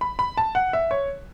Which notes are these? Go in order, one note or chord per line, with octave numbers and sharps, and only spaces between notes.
B5
B5
A5
F#5
E5
C#5